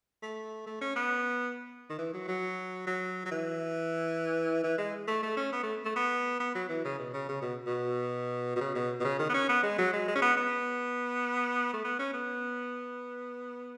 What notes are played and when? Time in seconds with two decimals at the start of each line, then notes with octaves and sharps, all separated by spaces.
0.22 A3
0.67 A3
0.81 C#4
0.96 B3
1.90 D#3
1.99 E3
2.14 F#3
2.28 F#3
2.87 F#3
3.26 F#3
3.31 E3
4.64 E3
4.78 G#3
5.08 A3
5.22 A3
5.37 C#4
5.52 B3
5.63 A3
5.85 A3
5.96 B3
6.40 B3
6.55 F#3
6.69 E3
6.84 C#3
6.99 B2
7.13 C#3
7.28 C#3
7.42 B2
7.67 B2
8.56 B2
8.61 C#3
8.75 B2
9.00 B2
9.04 C#3
9.19 D#3
9.29 B3
9.34 C#4
9.49 B3
9.63 G#3
9.78 F#3
9.93 G#3
10.08 G#3
10.15 C#4
10.22 B3
10.37 B3
11.73 A3
11.84 B3
11.99 C#4
12.14 B3